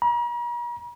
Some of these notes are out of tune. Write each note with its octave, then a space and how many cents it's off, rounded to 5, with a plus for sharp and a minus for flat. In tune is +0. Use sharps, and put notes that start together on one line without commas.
A#5 +45